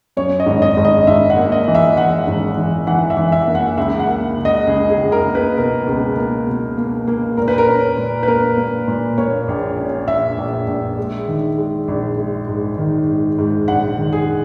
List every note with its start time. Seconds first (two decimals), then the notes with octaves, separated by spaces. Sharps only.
0.17 F#2 C#5
0.40 D#5
0.46 G#1
0.62 D#5
0.77 G#1
0.85 D#5
1.07 G#1 E5
1.30 F#5
1.37 A#3
1.52 D#5
1.68 E3
1.75 E5
1.97 E3 F#5
2.27 G#1
2.57 E3
2.87 E3 F#5
3.10 E5
3.17 E3
3.32 E5
3.47 A#3
3.55 F#5
3.77 C#2 E5
4.00 F#5
4.07 A#3
4.37 C#2
4.45 D#5
4.67 C#2 G#4
4.90 G#4
4.97 C#2
5.12 A#4
5.27 A#3
5.35 B4
5.57 B2 A#4
5.87 C#2
6.17 A#3
6.47 B2
6.78 A#3
7.08 A#3
7.37 A#2 A#4
7.48 B4
7.58 A#4
7.67 C#4
7.97 A#2
8.23 B4
8.28 A#3 A#4
8.58 A#3
8.88 A#2
9.18 A#3 C#5
9.48 A#1
9.78 C#4
10.08 A#1 E5
10.38 A#1
10.68 A#1
10.98 G#3
11.27 D#3
11.58 G#3
11.88 A#1
12.18 G#3
12.48 G#2
12.78 D#3
13.08 G#2
13.38 G#2
13.68 A#1 F#5
13.98 D#3
14.13 G#4